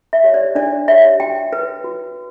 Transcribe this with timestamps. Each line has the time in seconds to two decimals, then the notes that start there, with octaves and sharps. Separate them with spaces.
0.13 E5
0.24 G4 C#5
0.34 D5
0.55 D4 D5
0.88 G4 C#5 E5
1.20 F#4 G5
1.53 B4
1.84 F#4